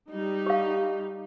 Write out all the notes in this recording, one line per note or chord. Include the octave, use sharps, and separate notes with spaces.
G3 D#4
G4 F5